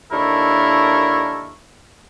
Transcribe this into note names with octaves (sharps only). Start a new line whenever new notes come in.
D#2 D4 E4 A4 A#4 C#6